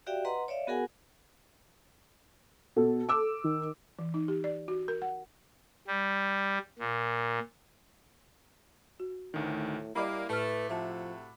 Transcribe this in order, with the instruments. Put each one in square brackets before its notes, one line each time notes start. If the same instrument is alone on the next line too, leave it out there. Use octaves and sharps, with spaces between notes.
[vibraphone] F#4 G4 D5 E5 F5 G5
B4 D#5 F#5 A#5 C6
C#5 D5 E5 F5
B3 F#4 G#4 A#4 F#5 G#5
[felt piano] B2 [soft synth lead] A4
[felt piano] D6 E6
[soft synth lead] D#3
[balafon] E3
D#4
G4
D5
F#4
A#4
F#5
[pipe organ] G3
A#2
[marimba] F#4
[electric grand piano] D2 D#3 [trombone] A2
[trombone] G3 [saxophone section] A#3 [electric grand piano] E4 D6 [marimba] D5 D#5 B5
[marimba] A2 F6 [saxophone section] A3 [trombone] B4
[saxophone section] C3 A3 F#4 [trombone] F3 [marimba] E5 A5